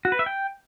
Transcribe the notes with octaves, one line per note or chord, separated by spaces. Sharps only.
F#4
B4
E5
G5